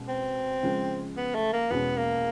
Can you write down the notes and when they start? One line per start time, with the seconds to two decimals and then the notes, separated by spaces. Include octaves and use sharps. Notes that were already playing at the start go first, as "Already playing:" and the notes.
Already playing: B2 G#3 C#4
0.08 C4
0.63 C#3 F3 G#3
1.17 B3
1.35 A3
1.53 A#3
1.70 E2 B2 G#3 B3 C#4
1.97 A#3